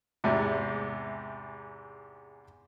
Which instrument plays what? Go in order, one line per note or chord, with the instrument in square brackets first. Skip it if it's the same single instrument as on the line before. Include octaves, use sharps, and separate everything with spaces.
[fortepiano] E2 G#2 C3